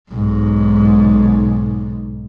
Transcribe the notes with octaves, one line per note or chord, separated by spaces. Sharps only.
B1 G#2